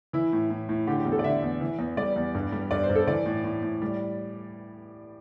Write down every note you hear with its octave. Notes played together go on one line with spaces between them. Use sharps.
E3 E4
A2
A2
A2
D3 G4
G4
E2
A4
D5
D3 E5
E2
E3
E2
G3 D5
E2
G2
G3
G2 D5
C5
G2
A4
E3 D5
A2
A2
A2
G3